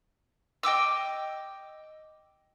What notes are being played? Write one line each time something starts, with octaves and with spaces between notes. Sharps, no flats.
D#5 G5 D6 E6